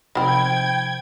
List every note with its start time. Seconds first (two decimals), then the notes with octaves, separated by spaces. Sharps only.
0.15 C3 D#3 F3 C4 G5 B5 G#6